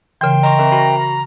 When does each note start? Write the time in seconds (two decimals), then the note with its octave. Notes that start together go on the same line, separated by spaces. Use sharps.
0.21 C#3 E3 A#4 G5 C6
0.43 D#5 A#5 C6 C#6
0.58 C4 A#4 E5
0.72 F#4 B5 A#6